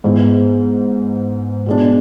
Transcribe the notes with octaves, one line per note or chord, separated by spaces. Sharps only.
G#2 G#3 B3 E4
B2 G#3 D4